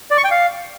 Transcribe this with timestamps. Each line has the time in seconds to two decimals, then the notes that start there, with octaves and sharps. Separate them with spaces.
0.11 D5
0.17 C#6
0.24 G5
0.31 F5